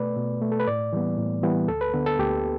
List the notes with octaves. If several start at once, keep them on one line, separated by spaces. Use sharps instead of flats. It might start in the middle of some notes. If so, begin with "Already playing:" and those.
Already playing: B2 A3 B4 D5
B2
A3
A4
B4
A2 D5
E3 G3 B3
A2
E3 G3 B3
D2 A4
B4
D3 B3
A4
D2 G4